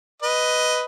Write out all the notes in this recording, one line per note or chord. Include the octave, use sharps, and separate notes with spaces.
B4 D#5